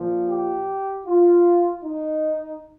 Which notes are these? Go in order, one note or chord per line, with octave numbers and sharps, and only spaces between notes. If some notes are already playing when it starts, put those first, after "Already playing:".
Already playing: A#2 F3
G4
F4
D#4